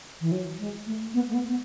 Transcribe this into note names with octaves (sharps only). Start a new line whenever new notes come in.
E3
F#3
G#3
A3
B3
A3
B3
B3